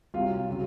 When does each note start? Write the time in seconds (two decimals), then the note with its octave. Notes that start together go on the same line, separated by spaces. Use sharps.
0.14 C2 C3 F#3 F4
0.50 C#3 F#3